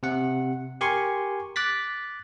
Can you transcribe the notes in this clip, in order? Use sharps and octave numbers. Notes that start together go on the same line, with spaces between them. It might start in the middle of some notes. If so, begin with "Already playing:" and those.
C3 F#5
G4 A#4 G#5 C6 C#6
D6 F#6 A6 B6